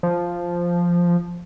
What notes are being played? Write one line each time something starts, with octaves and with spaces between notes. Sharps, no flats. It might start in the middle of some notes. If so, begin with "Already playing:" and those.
F3